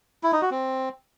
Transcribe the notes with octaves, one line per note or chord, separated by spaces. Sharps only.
E4
D#4
F#4
C4